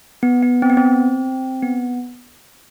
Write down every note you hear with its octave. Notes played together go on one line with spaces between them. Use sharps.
B3
B3
C4
B3
C4
B3